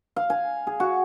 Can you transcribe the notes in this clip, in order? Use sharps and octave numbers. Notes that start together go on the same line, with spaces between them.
F5
G#5
G#4
F#4